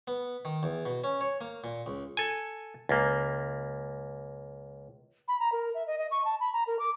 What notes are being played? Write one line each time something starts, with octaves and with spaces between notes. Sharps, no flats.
B3
D#3
E2
B2
C#4
C#5
A#3
A#2
C#2
A4 G#5
C#2 A#3
B5
A#5
A#4
E5
D#5
D#5
C#6
A5
B5
A#5
A#4
D6